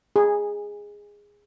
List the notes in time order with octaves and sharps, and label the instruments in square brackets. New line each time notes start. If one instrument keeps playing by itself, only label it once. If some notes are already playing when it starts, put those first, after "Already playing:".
[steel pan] G#4